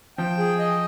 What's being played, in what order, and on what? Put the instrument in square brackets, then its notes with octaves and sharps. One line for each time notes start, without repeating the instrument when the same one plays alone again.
[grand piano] F3 [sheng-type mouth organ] G5
[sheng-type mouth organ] G#4
D#5